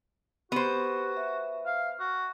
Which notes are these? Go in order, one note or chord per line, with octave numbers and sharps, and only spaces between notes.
B3 F#4 G4 C5
E5
F5
F#4